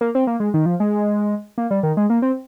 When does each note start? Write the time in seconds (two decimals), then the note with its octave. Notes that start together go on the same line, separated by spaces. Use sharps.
0.01 A#3
0.15 C4
0.27 A#3
0.40 G#3
0.54 D#3
0.66 F3
0.80 G#3
1.58 A#3
1.71 G3
1.83 D#3
1.97 G#3
2.10 A#3
2.22 C4